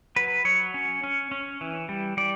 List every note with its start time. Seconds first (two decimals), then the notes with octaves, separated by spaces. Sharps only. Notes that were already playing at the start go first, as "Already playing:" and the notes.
0.16 F#3 B4
0.45 F#3 C#5
0.74 C#4
1.04 C#4
1.31 C#4
1.61 E3
1.89 G3
2.17 G3 D5